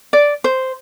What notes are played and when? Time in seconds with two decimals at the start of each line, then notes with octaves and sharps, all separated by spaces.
0.13 D5
0.44 C5